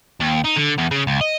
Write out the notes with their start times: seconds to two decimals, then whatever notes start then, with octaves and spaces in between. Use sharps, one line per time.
0.20 D#2
0.44 D#4
0.56 D3
0.78 E2
0.91 C#3
1.07 C#2
1.21 D#5